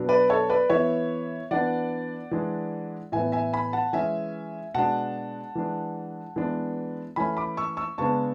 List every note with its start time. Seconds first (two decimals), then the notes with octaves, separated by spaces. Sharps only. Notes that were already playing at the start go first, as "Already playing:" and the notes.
Already playing: B2 F#3 B3 D4
0.09 B4 D5
0.30 A4 C#5
0.50 B4 D5
0.70 E3 B3 E4 C#5 E5
1.51 E3 B3 D4 D5 F#5
2.31 E3 G#3 D4
3.12 A2 E3 B3 E5 G#5
3.32 E5 G#5
3.53 G#5 B5
3.73 F#5 A5
3.93 E3 G#3 C#4 E5 G#5
4.74 B2 G#3 D4 F#5 A5
5.55 E3 G#3 D4
6.36 E3 G#3 B3 D4
7.16 E3 A3 C#4 G#5 B5
7.37 B5 D6
7.57 C#6 E6
7.77 C#6 E6
7.98 C#3 G#3 B3 D4 A5 C#6